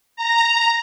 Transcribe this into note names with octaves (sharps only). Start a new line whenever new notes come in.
A#5